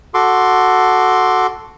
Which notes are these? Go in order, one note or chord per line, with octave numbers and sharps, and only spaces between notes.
F#4 A4 C6 D6